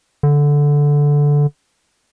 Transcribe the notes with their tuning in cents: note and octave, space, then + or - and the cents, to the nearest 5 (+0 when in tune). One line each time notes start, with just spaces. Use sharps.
D3 -10